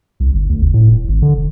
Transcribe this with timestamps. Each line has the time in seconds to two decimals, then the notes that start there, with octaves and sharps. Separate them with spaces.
0.20 C2
0.33 G1
0.50 D2
0.62 F#1
0.74 A2
0.90 D#1
1.08 G#1
1.22 D3
1.36 E1